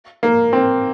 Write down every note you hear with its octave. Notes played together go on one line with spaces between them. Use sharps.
A#3
C4